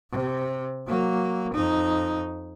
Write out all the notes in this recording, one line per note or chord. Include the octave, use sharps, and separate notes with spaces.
C3
F#3 A#3
F2 D#4